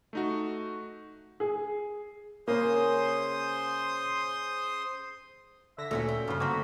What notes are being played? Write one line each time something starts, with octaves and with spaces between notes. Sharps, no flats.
A3 D#4 F#4
G#4
C#3 A#3 C5 C6 D#6
D3 E5 A#6 B6
D2 A#2 D3 A3 C#4 F#4 E5
G5
G2 C#3 F3 G4 C5 B5
D3 A3 A#3 C4 F#4 B6